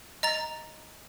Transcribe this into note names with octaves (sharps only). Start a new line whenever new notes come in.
D#5 A#5 A6